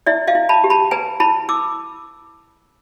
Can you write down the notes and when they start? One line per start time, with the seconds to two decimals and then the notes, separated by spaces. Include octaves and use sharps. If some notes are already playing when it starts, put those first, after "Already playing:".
0.06 E4 D5 E5
0.27 D#5 F5
0.35 E4
0.49 A5 B5
0.64 G4
0.70 A5 B5
0.91 B4 G#5 A#5
1.20 E4 A5 B5
1.49 E4 D6 E6